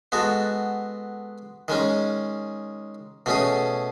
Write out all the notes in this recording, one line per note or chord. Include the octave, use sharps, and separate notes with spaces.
G#3 B3 F#4 A4
D#3 G#3 C#4
B2 A3 C#4 G#4